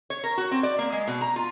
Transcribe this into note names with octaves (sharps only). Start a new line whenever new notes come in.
C#5
A#4
F#4
C4
D5
A#3
G#3
B2
A#5
F4